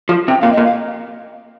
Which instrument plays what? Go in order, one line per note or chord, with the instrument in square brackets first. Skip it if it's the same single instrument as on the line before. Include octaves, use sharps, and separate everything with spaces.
[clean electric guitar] F3
[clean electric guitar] C3 [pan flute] G5
[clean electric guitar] A#2 [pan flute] F5
[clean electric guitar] A#2 [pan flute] D#5
[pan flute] F5